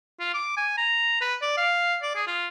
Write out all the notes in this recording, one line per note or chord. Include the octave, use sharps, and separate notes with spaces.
F4
D6
G#5
A#5
B4
D5
F5
D5
G#4
F4